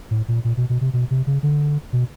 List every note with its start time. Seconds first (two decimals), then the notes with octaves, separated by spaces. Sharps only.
0.11 A2
0.28 A#2
0.44 A#2
0.57 B2
0.69 B2
0.81 C3
0.93 B2
1.11 C3
1.27 C#3
1.43 D3
1.93 B2